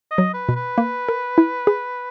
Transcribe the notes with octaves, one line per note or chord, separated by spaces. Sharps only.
D#5
F#3
B4
B2
B4
A#3
A#4
E4
G#4